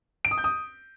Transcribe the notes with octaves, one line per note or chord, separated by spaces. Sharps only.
D7
D#6
G6
D#6